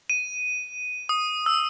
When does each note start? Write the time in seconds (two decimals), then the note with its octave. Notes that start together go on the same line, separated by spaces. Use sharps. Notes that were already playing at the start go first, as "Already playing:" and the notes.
0.10 D#7
1.09 D#6
1.46 E6